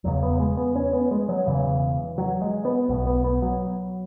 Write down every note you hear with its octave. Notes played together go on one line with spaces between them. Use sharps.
E1 E2 C#3 F#3
B3
G#3
B3
C#4
B3
G#3
F#3
E1 E2 C#3 E3
F#3
G#3
B3
B1 B2 B3
B3
B3
F#3